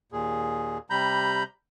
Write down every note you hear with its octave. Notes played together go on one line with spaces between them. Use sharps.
D#2 A#2 G#4
C3 G3 A#5 B5 G6